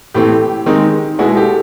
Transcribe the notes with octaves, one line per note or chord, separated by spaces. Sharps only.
A2 E3 A3 C4 G4
D#3 G#3 C4 D#4
B2 G#3 B3 E4 F#4 G#4
G4 A4